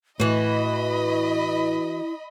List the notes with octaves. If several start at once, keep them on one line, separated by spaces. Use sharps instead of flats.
A2 E3 E4 F#4 D#5 B5